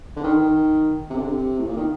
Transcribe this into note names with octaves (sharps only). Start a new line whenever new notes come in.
D3
D#3
D#3
C3
D3
C3
A2
A#2
D#3